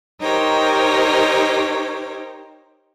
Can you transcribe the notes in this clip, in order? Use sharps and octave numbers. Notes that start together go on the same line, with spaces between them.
D#4 G4 A#4 C5 C#5